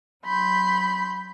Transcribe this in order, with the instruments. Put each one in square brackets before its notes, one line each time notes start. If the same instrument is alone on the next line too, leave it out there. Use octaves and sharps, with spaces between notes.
[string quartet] F#3 B5 C6 G6